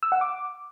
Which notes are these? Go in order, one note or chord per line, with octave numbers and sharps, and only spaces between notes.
E6
F#5
D6